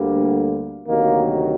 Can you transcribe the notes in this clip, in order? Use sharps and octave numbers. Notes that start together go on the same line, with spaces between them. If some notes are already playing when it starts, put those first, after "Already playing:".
Already playing: D2 D3 G3 A#3
D2 C3 D#3 F#3 A#3